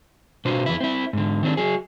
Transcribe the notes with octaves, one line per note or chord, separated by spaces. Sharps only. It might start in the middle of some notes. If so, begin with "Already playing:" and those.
B2 D4 F#4 C5
F2 E3 E4
C4 E4
G#2 D3
D#3 C4 D4
F#3 G#4